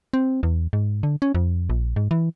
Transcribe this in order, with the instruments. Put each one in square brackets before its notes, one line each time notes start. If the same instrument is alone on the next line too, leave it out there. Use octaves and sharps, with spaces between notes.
[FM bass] C4
E2
G#2
D3
C#4
F2
A#1
G#2
E3